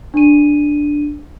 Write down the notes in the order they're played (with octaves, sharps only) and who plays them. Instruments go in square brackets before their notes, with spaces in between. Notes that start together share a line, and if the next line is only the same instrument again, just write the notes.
[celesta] D4 D#7